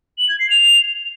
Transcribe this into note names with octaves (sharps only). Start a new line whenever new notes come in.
F#7
G#6
C7
F7